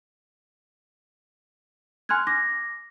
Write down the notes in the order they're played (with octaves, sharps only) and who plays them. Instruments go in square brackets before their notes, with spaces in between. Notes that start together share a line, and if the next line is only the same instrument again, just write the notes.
[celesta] G#5 C6 F6 F#6 G#6
D6 A#6